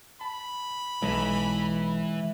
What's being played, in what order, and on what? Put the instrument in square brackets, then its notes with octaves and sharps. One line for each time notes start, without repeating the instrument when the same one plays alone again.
[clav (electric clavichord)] A5 [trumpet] B5
[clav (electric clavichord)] B1 [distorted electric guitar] E3 [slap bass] G#3